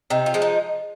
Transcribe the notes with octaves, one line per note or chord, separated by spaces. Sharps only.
C3 D#4
F4
F3 G#3
D#4